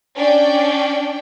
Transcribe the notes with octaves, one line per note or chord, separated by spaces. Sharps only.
C#4 D4 D5 G5